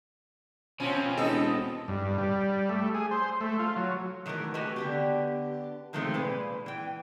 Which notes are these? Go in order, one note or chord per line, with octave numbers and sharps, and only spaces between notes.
B2 F3 C4 C#4
E1 A4 D#5
G2
G3
A3
G#4
C5
A3
F4
F#3
D#3 E3 F#3 A3 A#4
A3 F#4 G4 B4 D#5 G#5
D3 B3 G4
C3 D#3 F3 G#3 A3 C4
A#2 G#3 B4
E3 G5